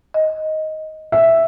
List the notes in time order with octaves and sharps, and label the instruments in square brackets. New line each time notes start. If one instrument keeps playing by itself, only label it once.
[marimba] D#5
[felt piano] E5